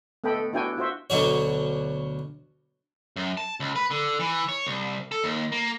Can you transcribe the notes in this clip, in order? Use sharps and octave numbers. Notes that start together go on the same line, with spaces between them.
A3 B3 A4 D#5 G5 B5
B3 D4 E4 F#4 G5 G#5
F4 F#4 C5 E5
D2 B2 F#3 F#4 C#5
F#2
A5
C#2
B4
D3
E3
C#5
C2
A4
D#2
A#3